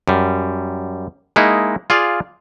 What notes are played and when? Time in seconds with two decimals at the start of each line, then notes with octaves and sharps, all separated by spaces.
0.08 F#2 G3
1.36 G#3 A#3 D#4 E4
1.90 F4 G#4 D5 F5